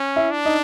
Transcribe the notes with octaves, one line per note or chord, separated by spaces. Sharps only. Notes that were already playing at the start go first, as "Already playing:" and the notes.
Already playing: C#4
E4
D4
D#4